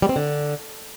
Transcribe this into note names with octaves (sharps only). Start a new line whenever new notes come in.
G3
C4
D3